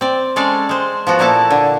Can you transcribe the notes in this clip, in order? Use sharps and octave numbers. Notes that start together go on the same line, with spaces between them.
C4 D5
G#3 C#4 A4 D5 F5
G#3 C5
F3 B3 F#4
A#2 A#3 E4 A4 A5
D3